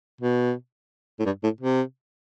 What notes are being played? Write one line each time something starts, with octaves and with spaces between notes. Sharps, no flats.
B2
A2
G2
A2
C3